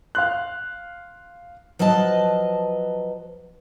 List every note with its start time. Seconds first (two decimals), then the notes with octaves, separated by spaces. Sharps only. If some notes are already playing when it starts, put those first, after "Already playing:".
0.15 F5 C6 F#6
1.79 F3 F#3 B4 D#5 A5